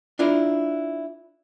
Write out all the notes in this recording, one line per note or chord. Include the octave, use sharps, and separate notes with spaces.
D4 E4 F4 A#4